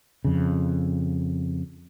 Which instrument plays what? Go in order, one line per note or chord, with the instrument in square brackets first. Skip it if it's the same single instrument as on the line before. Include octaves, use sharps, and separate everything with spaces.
[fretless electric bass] F2 C#3